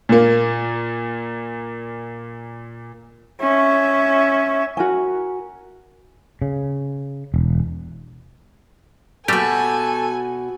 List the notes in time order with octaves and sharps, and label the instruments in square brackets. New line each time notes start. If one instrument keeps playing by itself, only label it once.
[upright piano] A#2 A#3
[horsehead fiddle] C#4 E5
[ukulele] F#4 A#4 G#5
[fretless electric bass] C#3
E1
[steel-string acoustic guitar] B2 F#4 [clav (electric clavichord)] G3 A3 G4 [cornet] A4 [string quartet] G#5